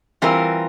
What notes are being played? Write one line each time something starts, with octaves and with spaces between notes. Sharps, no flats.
E3 G3 C4 F4 A#4